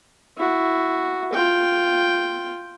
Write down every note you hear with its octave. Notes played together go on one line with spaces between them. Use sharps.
E4 F#4
F4 G5